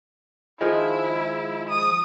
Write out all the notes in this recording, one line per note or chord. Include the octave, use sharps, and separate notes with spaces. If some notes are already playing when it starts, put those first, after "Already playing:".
D#3 F3 G#3 E4
D#6